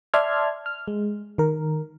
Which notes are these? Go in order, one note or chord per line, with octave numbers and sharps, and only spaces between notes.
D5 E5 A5 C6 F6 G#6
F6
G#3
D#3 A#4